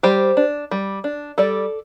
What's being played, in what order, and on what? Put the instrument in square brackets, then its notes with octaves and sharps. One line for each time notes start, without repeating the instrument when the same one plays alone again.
[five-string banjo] G3 G4 C5
D4
G3
D4
G3 A4 D5